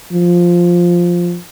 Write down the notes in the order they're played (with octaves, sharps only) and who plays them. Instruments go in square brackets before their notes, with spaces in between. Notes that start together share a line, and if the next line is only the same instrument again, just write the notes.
[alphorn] F3